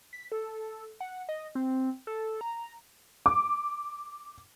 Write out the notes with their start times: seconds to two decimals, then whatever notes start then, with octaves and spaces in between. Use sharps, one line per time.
0.13 B6
0.32 A4
1.01 F#5
1.29 D#5
1.55 C4
2.07 A4
2.41 A#5
3.26 D6